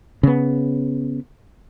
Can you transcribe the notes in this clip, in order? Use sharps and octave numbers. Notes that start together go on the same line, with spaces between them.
C#3 B3